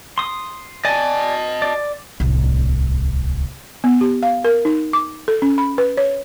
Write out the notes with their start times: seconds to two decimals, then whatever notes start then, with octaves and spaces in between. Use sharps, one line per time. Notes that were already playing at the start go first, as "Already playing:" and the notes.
0.18 C6 D#6
0.85 D5 D#5 G#5 A5
1.62 D5
2.20 D1 C2
3.84 B3
4.01 G4
4.23 F5
4.45 A#4
4.65 D#4
4.93 D6
5.28 A4
5.42 C#4
5.58 B5
5.78 B4
5.97 C#5